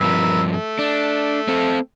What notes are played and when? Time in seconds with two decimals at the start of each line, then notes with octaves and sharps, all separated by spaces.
0.01 G2 F3 A#4 B4 E5
0.53 A3
0.79 D4
1.48 C4 A4